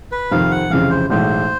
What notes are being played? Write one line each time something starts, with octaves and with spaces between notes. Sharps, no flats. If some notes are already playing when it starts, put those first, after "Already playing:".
B4
F2 C3 D#3 F5
F#5
F1 F2 C#3 E3 F5
C5
B1 A2 E3 G#3 C5